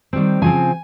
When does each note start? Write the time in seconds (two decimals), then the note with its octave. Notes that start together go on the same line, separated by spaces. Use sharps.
0.13 D#3 G3 C4
0.42 C#3 F3 C4 G#5